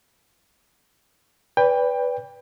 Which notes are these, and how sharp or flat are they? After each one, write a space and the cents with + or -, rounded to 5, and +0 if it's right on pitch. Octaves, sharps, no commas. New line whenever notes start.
B4 +0 D5 -30 G5 +20